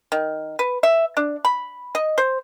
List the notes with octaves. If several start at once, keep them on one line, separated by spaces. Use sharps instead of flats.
D#3
B4
E5
D4
B5
D#5
C5